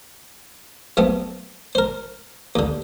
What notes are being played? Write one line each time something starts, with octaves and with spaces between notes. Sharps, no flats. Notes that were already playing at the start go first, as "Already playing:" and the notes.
F#2 A3 B3 C4
A#4 C5
D#2 D3